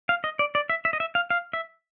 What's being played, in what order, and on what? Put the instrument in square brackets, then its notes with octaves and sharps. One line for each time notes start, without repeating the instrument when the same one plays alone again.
[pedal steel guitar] F5
D#5
D5
D5
E5
E5
D#5
E5
F5
F5
E5